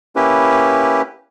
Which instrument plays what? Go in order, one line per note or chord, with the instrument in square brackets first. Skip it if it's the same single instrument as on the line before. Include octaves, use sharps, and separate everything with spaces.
[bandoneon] A#3 C#4 E4 G4 B4